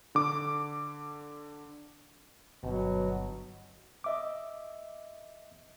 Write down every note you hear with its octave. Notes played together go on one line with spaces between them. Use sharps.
D3 D6
G1 B2 F#3
D#5 E5 D6